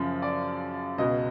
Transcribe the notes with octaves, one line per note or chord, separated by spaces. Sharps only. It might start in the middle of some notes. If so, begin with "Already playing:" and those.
Already playing: F#2 C#3 F3
D5
C#2 B2 D#5